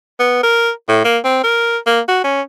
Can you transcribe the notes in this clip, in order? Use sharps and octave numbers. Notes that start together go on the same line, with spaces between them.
B3
A#4
A2
A#3
C4
A#4
A#3
F#4
C#4